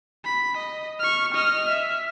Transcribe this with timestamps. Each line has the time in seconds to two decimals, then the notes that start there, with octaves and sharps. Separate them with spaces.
0.25 B5
0.57 D#5
1.00 C#6 F6
1.34 D#5 F6
1.69 E5